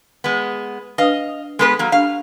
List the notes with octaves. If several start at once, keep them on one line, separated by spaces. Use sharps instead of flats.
G#3 B3
D4 B4 D#5 F5 D#6
G#3 B3 A4 B4
F#3 A#3
D4 G4 F5